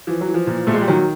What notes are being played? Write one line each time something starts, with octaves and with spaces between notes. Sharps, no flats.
E3 F3
F#3
E3
F3
A#2
A#2 A3
G#3
G3
D#3 F#3